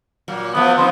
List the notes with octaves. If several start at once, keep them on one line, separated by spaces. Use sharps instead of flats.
A#2 F#3
F3 A3 B3
F3 C4 D#4 C5